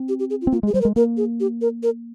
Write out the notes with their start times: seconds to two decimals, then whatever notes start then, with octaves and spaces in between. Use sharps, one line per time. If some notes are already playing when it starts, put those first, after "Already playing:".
Already playing: C4
0.09 G4
0.19 G4
0.30 G#4
0.41 F4
0.47 C4
0.52 A#3 F4
0.63 G#3 G#4
0.74 G3 C5
0.81 A#4
0.85 G#3
0.96 A#3 A#4
1.17 G#4
1.40 G4
1.61 A#4
1.83 A#4